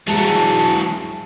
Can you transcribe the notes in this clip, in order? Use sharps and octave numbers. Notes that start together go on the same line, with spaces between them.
E3 F#3 G#3 F#4 A5